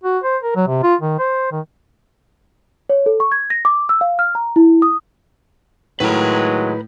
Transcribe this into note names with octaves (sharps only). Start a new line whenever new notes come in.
F#4
C5
A#4
F#3
C3
F4
D#3
C5
D#3
C#5
A4
C#6
G#6
A#6
D6
E6
F5
F6
A#5
E4
D#6
A2 D#3 F#3 G#3 B4 A#5